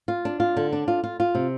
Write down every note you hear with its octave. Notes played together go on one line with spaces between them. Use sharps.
F4
D4
F4
D3
D4
F4
F4
F4
C3